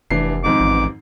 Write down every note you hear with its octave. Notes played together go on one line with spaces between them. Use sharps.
F1 E3 D4 C7
F2 G#2 D#3 D6
A1